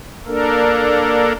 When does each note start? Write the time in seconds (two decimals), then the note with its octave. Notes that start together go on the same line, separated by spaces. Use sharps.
0.27 A#3 D4 A4 A#4